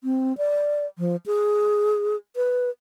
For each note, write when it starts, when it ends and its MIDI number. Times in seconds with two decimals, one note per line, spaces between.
0.04 0.36 60
0.38 0.86 74
0.99 1.16 53
1.26 2.16 68
2.36 2.70 71